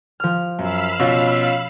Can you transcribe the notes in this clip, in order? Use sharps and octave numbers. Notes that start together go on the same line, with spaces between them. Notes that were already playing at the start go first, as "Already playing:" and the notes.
F3 F6
F#2 F5 B5 E6
B2 C#4 F4